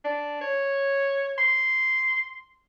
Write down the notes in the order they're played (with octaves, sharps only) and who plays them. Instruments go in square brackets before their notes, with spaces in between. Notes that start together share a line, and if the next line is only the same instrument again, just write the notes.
[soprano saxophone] D4
C#5
C6